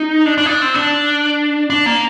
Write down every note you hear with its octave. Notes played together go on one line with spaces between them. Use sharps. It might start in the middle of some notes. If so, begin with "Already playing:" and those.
Already playing: D#4
D4
D4
D#4
D4
C4
D4
D4
A#3